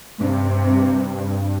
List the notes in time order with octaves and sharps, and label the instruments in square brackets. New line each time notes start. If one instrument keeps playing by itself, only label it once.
[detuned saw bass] G2 [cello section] C3